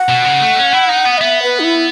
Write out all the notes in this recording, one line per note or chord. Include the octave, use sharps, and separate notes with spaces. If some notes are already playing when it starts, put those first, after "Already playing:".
Already playing: F#5
B2
C#3
A3
C#4
E4
D#4
B3
D#5
B3 E5
B4
D#4
E4